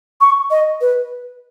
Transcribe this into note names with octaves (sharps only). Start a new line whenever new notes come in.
C#6
D#5
B4